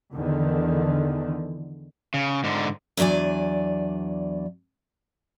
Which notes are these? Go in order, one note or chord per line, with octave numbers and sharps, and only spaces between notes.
E2 D3 D#3
C#3
G#2 D3
E2 F#3 D4 D5 G#5